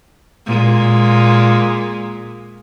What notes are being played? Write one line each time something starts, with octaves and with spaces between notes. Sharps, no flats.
A#2 G#3